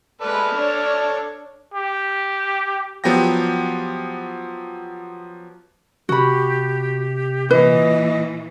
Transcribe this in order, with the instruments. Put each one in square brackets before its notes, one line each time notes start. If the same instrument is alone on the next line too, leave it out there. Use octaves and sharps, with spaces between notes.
[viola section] G#3 B4 [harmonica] A4 D5 F6
[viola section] D4 C#5
[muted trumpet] G4
[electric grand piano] F3 F#3 B3 G4 G5 A#6
[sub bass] C3 [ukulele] F#4 B5 [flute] G4
[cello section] A#2 E3 [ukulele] B4 [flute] D#5